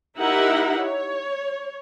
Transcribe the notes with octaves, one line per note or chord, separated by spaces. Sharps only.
D#4 E4 G4 A#4 E5 F#5
C#5